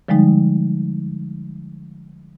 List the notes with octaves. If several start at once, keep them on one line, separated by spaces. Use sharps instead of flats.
D3 F3 G3 G#3 D#4